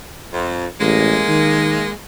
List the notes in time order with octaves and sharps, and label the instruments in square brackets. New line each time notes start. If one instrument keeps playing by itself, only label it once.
[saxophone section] F2
[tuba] A1 [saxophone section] G#3 A#3
[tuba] D#3